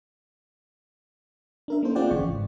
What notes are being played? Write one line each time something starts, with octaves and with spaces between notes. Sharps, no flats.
D4 A#4 E5
A#3 C#4 D#4 E4 A4 C5
C4 F4 G#4 D5 F#5 G5
G1 C#3 E3 F4 D5 C#6
G#2